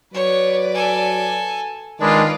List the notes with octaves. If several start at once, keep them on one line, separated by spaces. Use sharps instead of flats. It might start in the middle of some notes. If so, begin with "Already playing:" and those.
F#3 B4 C#5 D5
A4 G#5
D#3 G#3 D4 F4 B4 D5